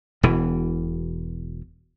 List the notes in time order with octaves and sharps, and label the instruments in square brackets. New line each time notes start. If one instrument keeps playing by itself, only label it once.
[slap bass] E1 B2 E3